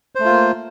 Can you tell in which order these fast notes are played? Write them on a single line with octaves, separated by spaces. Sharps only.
C5 A3 F4 A#3